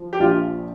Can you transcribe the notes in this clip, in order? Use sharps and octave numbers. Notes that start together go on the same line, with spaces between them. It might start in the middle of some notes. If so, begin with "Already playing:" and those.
Already playing: F3
G4
A#1 F4